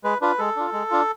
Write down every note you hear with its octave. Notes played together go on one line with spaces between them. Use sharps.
G#3 B4
D4 F4 B4
G#3 A4
D4 F4
G#3
D4 F4